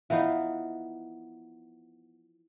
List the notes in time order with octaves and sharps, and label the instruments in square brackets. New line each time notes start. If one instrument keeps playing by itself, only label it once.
[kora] E3 F3 B3 D#4